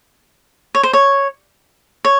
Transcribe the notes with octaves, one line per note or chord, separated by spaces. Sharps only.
C#5
C5
C#5
C#5